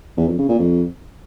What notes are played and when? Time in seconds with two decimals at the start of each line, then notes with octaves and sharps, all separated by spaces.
0.17 E2
0.28 F2
0.38 C#3
0.49 A#2
0.59 F2